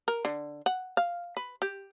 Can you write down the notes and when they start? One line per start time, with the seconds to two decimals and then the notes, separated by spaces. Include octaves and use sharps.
0.08 A#4
0.25 D3
0.66 F#5
0.97 F5
1.37 B4
1.62 G4